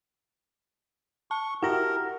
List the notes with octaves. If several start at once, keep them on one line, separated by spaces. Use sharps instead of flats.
A5 C#6
E4 F#4 G4 A#4 F#5 A#6